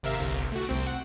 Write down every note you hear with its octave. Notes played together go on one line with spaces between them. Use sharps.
G#1 C3 A#4 E5 F5 E6
G1 C2
A3 F#4
C2 C4 D7
F#5